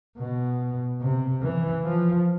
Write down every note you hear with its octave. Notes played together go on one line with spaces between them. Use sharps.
B2
C3
E3
F3